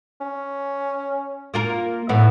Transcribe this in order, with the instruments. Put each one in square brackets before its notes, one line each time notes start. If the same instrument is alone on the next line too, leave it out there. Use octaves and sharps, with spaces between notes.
[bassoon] C#4
[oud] A#3 F4 A#4
[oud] A2 E3 [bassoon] B3